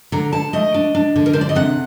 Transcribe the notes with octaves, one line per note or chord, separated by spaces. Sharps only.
D3 A#5
D3 A5
A3 D#5
D4
D4
D3
A#4
D4 C5
D5
D#5
C3 F#5